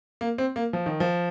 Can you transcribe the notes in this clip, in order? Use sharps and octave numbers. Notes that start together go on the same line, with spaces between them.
A#3
C4
A#3
F3
D#3
F3